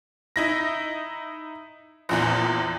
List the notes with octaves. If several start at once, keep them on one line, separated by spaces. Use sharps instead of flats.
D#4 E4 A#6
A#1 E2 A#2